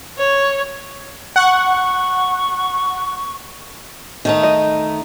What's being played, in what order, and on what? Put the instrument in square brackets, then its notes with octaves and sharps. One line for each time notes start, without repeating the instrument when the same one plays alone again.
[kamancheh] C#5
[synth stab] F#5 [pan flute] C#6
[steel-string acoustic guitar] D#3 A3 D#4
[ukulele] D#5